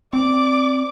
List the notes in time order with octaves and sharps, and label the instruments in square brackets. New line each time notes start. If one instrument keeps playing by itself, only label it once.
[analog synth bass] C4 [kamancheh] D5 [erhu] D6